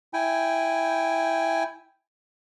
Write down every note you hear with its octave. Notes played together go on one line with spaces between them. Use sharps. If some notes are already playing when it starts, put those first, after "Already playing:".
E4 G5 G#5